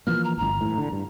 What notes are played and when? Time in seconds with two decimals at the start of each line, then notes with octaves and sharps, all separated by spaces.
0.07 E3 F3 A#3 F6
0.24 A#5
0.38 D1 G1 A#5
0.61 A2 E3
0.78 D3
0.92 G2